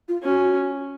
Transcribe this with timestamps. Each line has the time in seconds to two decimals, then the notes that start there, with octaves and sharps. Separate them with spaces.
0.08 F4
0.23 C#4 F#4